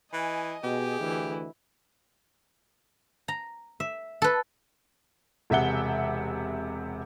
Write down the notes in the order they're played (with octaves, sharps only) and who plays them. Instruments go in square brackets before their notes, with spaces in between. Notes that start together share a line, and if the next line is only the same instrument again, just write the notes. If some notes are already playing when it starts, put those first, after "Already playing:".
[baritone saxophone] E3 [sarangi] D#5 [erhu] G#5
[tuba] B2 [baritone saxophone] G4 [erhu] G#4
[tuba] D2 [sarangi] E3
[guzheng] A#5
E5
A4 B4
[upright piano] E1 C3 E5 F#5 G7